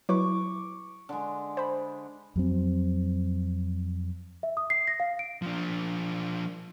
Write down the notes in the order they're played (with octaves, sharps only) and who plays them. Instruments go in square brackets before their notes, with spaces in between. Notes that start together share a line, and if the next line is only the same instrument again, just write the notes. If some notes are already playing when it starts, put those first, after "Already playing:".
[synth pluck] F#3 E4 B4 [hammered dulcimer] C#6 D6
[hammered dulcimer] D3 G#3
[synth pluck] C5 B5
[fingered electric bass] F2 F#3 C4
[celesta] E5
D#6
C7
A#6
F5
D7
[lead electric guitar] F3 D4